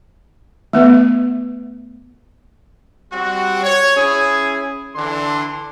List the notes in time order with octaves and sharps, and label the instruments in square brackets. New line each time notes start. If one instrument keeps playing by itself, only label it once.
[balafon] A3 B3 B4 E5
[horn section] G3 C4 F#4
C#5
C#4 E4 G#4
D3 E3 D4 C6